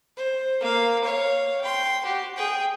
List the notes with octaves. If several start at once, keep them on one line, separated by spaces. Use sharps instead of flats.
C5
A#3 F5
C#5 F5
G5 C6
F#4 G4
G#4 G5